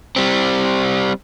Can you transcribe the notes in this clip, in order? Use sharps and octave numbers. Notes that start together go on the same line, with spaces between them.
G3 C4